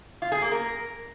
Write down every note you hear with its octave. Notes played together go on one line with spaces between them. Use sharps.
F4
G#4
A#3
A#4